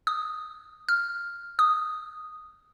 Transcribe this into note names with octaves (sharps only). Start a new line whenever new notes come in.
D#6
F6
D#6